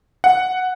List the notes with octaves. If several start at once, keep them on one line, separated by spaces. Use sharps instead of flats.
F#5